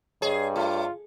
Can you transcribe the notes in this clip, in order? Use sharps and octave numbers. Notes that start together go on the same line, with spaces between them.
G2 G#4 C#5 D#5
A3 F4